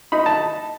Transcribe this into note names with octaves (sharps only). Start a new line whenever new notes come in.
D#4 B5
A5